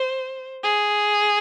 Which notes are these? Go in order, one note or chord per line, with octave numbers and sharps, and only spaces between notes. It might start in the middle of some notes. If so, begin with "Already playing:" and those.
Already playing: C5
G#4